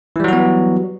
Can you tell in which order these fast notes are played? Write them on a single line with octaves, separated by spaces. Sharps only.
E3 G3 F#3 F#4 B3